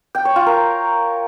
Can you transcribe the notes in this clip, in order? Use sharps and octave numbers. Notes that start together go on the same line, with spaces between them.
G5
C#5
F4
A#4